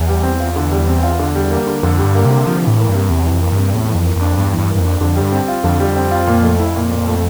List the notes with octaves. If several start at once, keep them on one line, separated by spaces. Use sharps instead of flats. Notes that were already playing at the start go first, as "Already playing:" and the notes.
Already playing: E2
G3
C4
F4
D3
G3
C4
F4
D3
G3
A#3
D3
F2 D3
G3
G2
A#3
C3
D3
C3 F3
A2 E3
A#3
G2
C3
E2 C3
E3
F2
A#3
G2 C3
E2 A2
E3
F2
A#3
F2
D4
E2 G2
E3
G2
A#3
G2
F2
D4
F2 D3
G2 G3
C4
F4
F2 D3
G3
C4
F4
A#2
A3
E4
A#2
A#2
A3